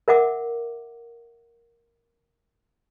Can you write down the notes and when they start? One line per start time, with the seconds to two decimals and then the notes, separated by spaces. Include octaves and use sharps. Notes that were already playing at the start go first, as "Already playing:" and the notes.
0.08 A#4 E5 F#5 D6